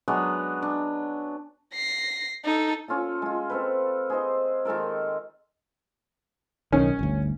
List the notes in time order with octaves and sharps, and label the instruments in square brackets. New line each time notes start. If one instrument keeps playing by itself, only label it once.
[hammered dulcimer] F#3 G#3 B3 D4
D4
[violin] A#6 C7
D#4 A4
[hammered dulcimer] C#4 F4 A4 A5
G#3 F4
C4 A4 B4
G#4 A4 C5 D#5
D#3 G#3 A4 A#4
[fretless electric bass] B1 D#3 [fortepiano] C#4
[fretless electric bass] G1 D2